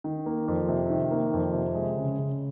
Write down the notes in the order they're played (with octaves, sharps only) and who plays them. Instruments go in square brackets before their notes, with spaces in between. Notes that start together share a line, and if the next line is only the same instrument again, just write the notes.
[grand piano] D#3
A#3
F2
C3
D#3
A#3
F2
C3
G#3
C#3
C#3